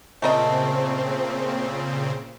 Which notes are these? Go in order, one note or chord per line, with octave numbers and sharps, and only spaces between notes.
A#2 C#3 A3 C4 A#4 C5 D#5